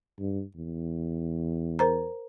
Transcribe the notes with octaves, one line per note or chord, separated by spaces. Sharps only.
G2
E2
A#4 C5 A#5